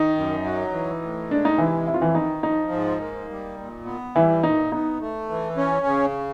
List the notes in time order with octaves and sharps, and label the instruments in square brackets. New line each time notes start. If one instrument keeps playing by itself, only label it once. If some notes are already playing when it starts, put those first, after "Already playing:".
Already playing: [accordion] D#3 [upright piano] D#4
[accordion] F#2
F#3
E3
A2
[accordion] G#3 [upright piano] D4
[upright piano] D#4
[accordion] C3 [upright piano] E3 E4
[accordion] F2 [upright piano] E4
[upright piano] F4
E3 E4
[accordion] D#3 [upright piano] D#4
[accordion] F3 [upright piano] D#4
[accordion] G#2
A#3
G3
A#2
B3
[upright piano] E3 E4 [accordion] G3
[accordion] A#2 [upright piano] D#4
[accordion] B3 [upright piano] D#4
[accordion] A3
E3
C#4
C#3